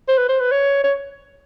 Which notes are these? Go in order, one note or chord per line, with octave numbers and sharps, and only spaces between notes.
C5
B4
C5
B4
C#5
C#5